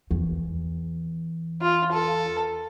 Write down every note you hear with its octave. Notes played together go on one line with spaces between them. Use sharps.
E2
F4
A4